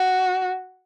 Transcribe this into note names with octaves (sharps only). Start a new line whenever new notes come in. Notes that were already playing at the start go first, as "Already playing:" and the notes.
Already playing: F#4